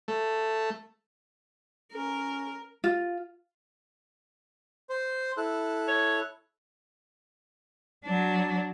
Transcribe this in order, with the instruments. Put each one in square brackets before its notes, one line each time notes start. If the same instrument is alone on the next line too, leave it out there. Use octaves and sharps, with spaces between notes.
[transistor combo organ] A3
[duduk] C#4 [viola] A#4
[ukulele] F4
[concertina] C5
E4 A4 F#6
[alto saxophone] C#5
[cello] F#3 D4